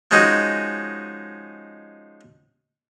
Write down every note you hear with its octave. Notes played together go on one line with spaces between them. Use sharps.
F3 G#3 C#4 D#4 F#4